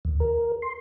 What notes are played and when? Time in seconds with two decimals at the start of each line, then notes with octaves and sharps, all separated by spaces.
0.05 D#2
0.20 A#4
0.62 C6